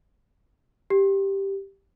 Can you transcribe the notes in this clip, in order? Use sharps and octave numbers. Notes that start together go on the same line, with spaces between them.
G4